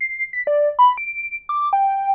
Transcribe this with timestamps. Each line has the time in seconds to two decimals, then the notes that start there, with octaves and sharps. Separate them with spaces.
0.01 C7
0.33 B6
0.47 D5
0.79 B5
0.98 D7
1.49 D6
1.73 G5